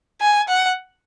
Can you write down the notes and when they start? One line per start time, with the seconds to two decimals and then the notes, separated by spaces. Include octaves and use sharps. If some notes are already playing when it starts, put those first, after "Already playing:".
0.21 G#5
0.48 F#5